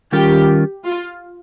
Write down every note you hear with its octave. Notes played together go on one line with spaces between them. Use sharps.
D#3 G3 C#4 F4 G4 A#4
F4